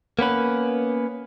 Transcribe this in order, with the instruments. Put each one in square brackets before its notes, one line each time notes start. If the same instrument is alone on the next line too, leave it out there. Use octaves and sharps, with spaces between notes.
[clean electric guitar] A#3 B3 C#4 B4